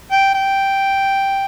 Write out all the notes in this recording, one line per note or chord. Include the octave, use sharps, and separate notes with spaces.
G5
G5